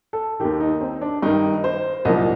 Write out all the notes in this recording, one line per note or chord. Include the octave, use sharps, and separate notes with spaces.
A4
D#2 D#3 G4
D#4
C4
D4
G2 D#3 D#4
C5
C2 A#2 F3 D#5